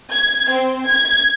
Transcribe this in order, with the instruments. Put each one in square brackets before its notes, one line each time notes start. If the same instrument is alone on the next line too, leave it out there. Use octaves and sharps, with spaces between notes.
[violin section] G#6
C4
G#6